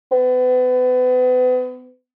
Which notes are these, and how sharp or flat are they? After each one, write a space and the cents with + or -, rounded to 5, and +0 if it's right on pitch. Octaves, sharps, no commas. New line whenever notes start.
B3 +35